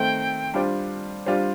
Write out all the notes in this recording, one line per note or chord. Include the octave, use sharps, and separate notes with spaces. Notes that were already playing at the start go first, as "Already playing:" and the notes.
Already playing: D#3 A3 C4 G5
G3 D4 F4 C5
G3 D4 F4 C5